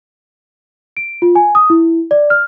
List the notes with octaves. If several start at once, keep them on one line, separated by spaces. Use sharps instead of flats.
D7
F4
G#5
D#6
E4
D5
F6